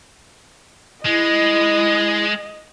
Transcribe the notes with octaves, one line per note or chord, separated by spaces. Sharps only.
G#3 E4 D#5